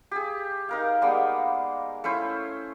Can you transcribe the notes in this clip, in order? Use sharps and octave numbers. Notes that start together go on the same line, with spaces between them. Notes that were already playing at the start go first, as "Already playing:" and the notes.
G4 G#4
D#4 A#4 F5
G3 G#3 A#3 B3
A3 C#4 E4 C5